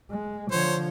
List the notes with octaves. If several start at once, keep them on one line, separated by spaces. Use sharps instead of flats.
G#3
D3 F3 C5 C#5